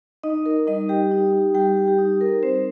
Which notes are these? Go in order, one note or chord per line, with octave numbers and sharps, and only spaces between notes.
D#4 D#5
D#4 A#4
G3 D#4 D#5
G3 G4 G5
D#4
D#4
G3 G4 G5
G3
G4
D#4
D#4 A#4
G3 C4 C5